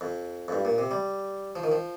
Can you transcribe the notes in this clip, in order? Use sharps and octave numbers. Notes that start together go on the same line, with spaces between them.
F2
F2
G2
A#2
C3
G3
F3
D#3
F3